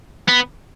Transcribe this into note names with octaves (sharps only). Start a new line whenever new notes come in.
B3